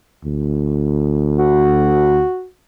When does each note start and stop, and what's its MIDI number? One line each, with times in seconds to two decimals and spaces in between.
0.25 2.23 38
1.38 2.47 66